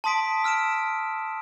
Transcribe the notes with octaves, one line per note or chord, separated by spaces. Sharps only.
A5 C6 D#6 B6 D7
E6 F6 D7 E7